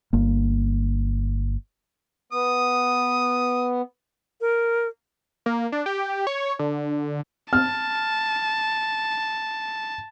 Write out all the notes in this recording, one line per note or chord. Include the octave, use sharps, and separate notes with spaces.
G1 A#3
B3 D#6
A#4
A#3
D4
G4
C#5
D3
A5 F6